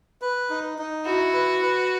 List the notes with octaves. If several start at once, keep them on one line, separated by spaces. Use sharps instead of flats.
B4
D#4
D#4
E4 F#4
B4
B4